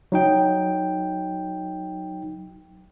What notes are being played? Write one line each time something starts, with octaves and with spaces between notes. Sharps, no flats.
F#3 D#4 G5